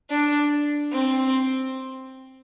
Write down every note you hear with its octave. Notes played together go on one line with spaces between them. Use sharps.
D4
C4